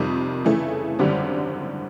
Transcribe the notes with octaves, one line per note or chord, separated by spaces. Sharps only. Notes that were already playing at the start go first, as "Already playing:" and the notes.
Already playing: F2 C3 D#3 G3
C#3 E3 A3
G#1 F#2 D3 G3 C4